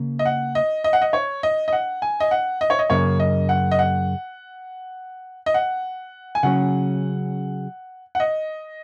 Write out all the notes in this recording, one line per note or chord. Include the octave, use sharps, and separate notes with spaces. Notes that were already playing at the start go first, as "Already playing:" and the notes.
Already playing: C#3 A#3
D#5
F#5
D#5
D#5
F#5
D#5
C#5
D#5
D#5
F#5
G#5
D#5
F#5
D#5
C#5
D#5
F#2 C#3 A#3 C#5
D#5
F#5
D#5
F#5
D#5
F#5
G#5
C#3 F#3 C#4 F#5
F#5
D#5